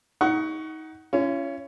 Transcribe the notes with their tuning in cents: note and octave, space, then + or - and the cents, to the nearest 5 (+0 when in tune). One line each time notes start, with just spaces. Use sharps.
D#4 +25 F#5 +20 C#6 +10
C#4 +10 F4 -45